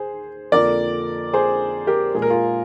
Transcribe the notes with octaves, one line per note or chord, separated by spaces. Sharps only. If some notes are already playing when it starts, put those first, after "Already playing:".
Already playing: D#2 G#4 C5
F2 D3 F3 A#3 A#4 D5
G#4 C5
G4 A#4
A#2 G#3 G#4
A#4
F4 G#4